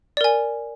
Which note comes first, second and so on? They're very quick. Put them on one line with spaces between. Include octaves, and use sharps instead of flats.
D5 A#4 G#5